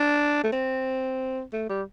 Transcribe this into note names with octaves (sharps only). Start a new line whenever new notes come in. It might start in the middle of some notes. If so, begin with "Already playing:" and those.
Already playing: D4
A3
C4
A3
G3